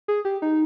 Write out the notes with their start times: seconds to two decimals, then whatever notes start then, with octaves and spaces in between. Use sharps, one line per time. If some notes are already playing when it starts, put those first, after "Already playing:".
0.08 G#4
0.25 G4
0.42 D#4